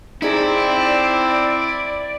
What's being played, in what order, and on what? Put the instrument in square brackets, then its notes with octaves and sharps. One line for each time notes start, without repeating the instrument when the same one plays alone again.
[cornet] C4 [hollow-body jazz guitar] D#4 G#4 A#5 [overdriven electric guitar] E4 [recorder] D5